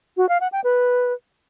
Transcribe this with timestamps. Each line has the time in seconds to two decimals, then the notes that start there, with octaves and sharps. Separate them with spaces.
0.17 F#4
0.29 F5
0.41 F#5
0.52 G5
0.64 B4